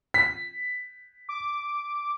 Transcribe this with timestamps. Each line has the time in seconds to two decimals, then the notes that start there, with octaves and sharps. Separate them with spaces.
0.14 B6
1.29 D6